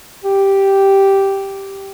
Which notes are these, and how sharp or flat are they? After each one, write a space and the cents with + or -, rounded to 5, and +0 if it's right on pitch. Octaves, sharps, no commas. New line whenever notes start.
G4 -5